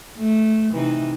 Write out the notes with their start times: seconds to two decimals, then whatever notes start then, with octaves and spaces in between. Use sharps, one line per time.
0.17 A3
0.71 C3 E3 D#4